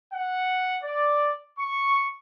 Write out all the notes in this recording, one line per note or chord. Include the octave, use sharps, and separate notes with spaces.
F#5
D5
C#6